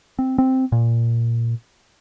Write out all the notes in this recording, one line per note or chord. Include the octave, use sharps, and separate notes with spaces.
C4
C4
A#2